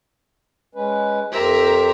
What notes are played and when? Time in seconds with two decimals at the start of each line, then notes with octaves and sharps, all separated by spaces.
0.75 G#3 C#4 B4
1.32 F2 G4 A#4 C5 E5